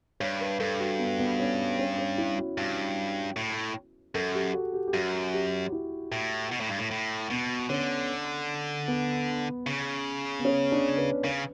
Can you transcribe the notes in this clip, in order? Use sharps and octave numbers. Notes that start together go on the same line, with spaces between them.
G2 C#5
B4
G2 A4
F#4
B3
B3
C#4
C#4
C#4
E4
F#4
G2
A2
F#2 A4
G4
F#4
G4
G4
F#2 F#4
G4
E4
A2
B2
A2
G2
A2
A2
B2 B3
D3 C#4
B3
C#3
B3
C#4
D4
B4
C#3 B4